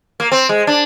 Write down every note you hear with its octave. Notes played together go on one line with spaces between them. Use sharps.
A#3
C4
G#3
D4